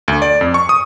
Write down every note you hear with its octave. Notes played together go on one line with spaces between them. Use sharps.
D2
D5
F2
C#6
D#6